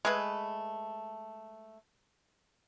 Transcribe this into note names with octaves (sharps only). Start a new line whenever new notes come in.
G#3 A3 G#4 B4